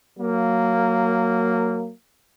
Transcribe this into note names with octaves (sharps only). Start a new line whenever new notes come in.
F#3 A#3